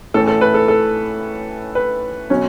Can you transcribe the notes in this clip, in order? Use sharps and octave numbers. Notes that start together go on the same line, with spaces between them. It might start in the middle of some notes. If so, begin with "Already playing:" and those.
A2 E3 A3 C#4 A4
A4
B4
A4
A4
B4
B2 F#3 C#4